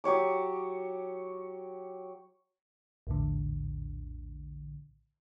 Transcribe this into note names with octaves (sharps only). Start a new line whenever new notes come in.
F#3 G4 C#5 D6
A#1 E2 A2 D3